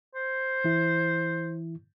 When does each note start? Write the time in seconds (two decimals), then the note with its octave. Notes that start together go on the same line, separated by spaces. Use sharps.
0.15 C5
0.64 E3 E4